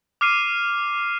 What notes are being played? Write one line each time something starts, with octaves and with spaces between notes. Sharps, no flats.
D6 F6 C7 D#7